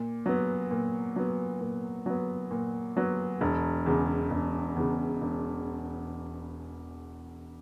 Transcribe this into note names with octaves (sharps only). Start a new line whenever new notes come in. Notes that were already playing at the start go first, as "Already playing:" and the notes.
Already playing: A#2
F#3 B3
A#2
F#3 B3
A#2
F#3 B3
A#2
F#3 B3
E1
E2 C#3
E1
E2 C#3
E1